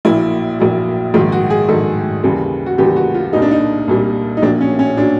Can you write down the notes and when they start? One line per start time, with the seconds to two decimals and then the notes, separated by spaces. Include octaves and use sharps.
0.05 A#1 A#2 F#3 E4
0.59 A#1 A#2 F#3
1.14 A#1 G#2 D#3 F#3 F4
1.32 F#4
1.50 G#4
1.69 A#1 G#2 D#3 F#3 A4
2.24 D#2 C#3 E3 G3
2.66 F#4
2.78 D#2 C#3 E3 G3 G4
2.96 F#4
3.14 F4
3.33 C2 A#2 G3 D#4
3.42 D4
3.51 D#4
3.88 C2 A#2 G3
4.37 D#4
4.42 A#1 A#2 F#3 D4
4.61 C#4
4.79 C#4
4.97 A#2 F#3 D4